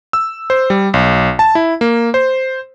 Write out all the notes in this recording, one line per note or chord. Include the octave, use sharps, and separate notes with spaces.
E6
C5
G3
B1
A5
E4
A#3
C5